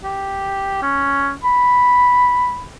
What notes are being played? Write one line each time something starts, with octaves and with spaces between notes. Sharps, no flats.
G4
C#4
B5